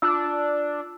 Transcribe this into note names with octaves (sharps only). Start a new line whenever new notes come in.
D4 F4 E6